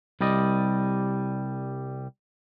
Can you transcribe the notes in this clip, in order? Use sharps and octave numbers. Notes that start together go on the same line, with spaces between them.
C2 G3 D5 D#5